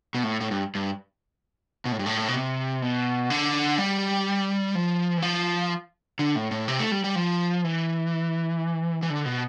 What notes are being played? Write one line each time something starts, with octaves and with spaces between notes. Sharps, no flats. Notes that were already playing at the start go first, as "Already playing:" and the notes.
B2
A2
A2
G2
G2
B2
A2
G2
A2
B2
C3
B2
D3
G3
F3
E3
F3
D3
A2
A2
C3
A3
G3
G3
F3
E3
E3
D3
B2